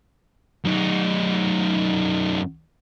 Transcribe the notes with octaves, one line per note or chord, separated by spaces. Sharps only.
F#2 D#4